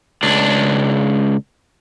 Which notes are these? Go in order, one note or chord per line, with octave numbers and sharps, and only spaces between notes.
C#2 D4